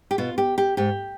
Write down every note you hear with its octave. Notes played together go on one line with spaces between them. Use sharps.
G4
B2 F4
G4
G4
G#2 G4